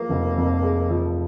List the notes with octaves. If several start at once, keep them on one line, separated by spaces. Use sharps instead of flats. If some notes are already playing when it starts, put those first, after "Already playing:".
Already playing: F3 G#3 A#3
F1
F2
G#3
F3